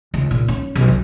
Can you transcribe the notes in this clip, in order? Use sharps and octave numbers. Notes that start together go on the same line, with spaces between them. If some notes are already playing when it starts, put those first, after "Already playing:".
C#2
A#2
C#4
B1
D3